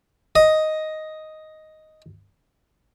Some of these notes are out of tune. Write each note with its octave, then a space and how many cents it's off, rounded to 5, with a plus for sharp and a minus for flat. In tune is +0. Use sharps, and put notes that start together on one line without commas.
D#5 +5